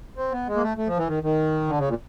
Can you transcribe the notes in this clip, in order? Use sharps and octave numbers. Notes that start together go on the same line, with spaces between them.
C4
B3
G#3
A#3
A3
A3
F3
E3
D#3
D#3
D3
C#3
A#2